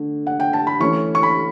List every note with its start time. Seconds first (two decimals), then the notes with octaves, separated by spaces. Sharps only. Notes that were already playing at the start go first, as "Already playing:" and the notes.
Already playing: D3 A3
0.27 F#5
0.40 G5
0.53 A5
0.67 B5
0.80 E3 A3 C#4 C#6
1.15 C#6
1.23 B5